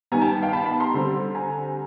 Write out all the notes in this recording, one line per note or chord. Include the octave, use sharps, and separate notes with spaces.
D#3 G3 B3 G#5 A#5
G5 A5
F5 G5
A5 B5
A5 B5
A#5 C6
D3 G3 C4
G#5 A#5